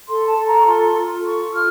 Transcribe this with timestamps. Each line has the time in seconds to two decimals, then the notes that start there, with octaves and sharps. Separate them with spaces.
0.09 A4 C6
0.28 A5
0.38 A4
0.47 A#5
0.59 C#6
0.66 F4 C6
0.96 F4
1.24 A4 C#6
1.53 F4 F6